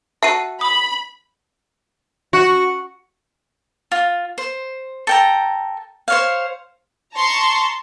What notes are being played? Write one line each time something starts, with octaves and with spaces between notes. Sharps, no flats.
F#4 A4 E5 C7 D#7
B5 D#6
F#4
F4
C5
A4 G5 A#5
C5 C#5 F5
A5 A#5 C6 C#6